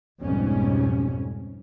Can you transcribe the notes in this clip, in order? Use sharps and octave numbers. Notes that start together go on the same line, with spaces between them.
B1 F2 G#2 B2 G3 C#4